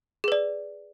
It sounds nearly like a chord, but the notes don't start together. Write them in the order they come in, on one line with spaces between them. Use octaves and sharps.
G#4 B4 D5